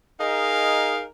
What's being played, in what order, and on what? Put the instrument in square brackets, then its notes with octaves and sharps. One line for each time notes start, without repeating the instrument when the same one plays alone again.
[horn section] D#4 G#4 A#4 D#5 F5